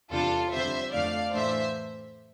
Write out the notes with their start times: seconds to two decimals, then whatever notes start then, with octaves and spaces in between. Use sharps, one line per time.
0.11 E2 C3 G3 D4 F4 A4
0.52 F2 D3 G3 C4 C5 E5
0.93 F2 D3 A3 D4 D5 F5
1.34 A2 E3 A3 D4 C5 E5